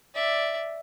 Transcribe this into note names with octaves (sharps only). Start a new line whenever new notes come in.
D5 E5